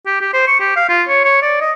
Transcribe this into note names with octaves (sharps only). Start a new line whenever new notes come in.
G4
G4
C5
C#6
G4
F5
F4
C#5
C#5
D5
D#5